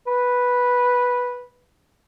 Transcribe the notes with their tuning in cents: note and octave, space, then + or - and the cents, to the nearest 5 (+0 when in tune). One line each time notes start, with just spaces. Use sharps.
B4 -5